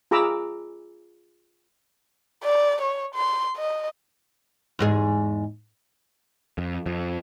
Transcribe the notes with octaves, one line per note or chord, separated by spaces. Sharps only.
F4 G#4 A#5 B5 D6 E6
D5
C#5
C6
D#5
E2 G#2 G#4
F2
F2